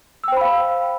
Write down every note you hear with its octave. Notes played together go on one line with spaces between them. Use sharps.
C5 F5 G5 B5 E6